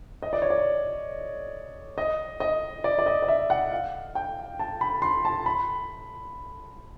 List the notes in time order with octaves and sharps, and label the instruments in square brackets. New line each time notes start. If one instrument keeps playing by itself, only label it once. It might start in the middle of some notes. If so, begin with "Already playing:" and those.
[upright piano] D#5
D5
C#5
D5
D#5
D#5
D5
D5
D#5
D#5
E5
F#5
F5
G5
A5
B5
C6
A5
B5